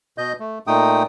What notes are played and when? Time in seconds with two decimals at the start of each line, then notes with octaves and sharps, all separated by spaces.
0.18 B2 D#5 G6
0.40 A3
0.67 A#2 A3 D#4 G5 D#6